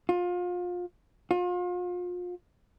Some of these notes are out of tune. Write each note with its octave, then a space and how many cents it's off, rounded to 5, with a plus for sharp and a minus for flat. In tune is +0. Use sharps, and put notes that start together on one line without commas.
F4 +30
F4 +35